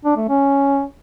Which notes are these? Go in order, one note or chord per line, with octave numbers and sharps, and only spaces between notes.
D4
A3
C#4